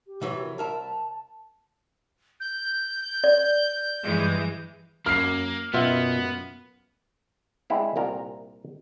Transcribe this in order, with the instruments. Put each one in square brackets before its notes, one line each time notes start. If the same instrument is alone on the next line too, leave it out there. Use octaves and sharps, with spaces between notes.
[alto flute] G4
[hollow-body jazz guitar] C3 E3 F#3
[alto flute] A#4
[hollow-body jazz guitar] C2 A#4 E5 [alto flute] A5
[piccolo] G6
[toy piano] D5
[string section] G2 E3 G#3
[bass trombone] F#2 [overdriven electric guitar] A#3 [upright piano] F6 C7
[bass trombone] F#2 [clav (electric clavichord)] B2 F4 E5 [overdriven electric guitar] B3
[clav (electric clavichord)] G#3 C4 D4 E4 F5
C2 A#2 A#4 A#5